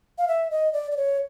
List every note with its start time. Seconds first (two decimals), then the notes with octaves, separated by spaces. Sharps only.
0.18 F5
0.28 E5
0.51 D#5
0.73 D5
0.91 D5
0.97 C#5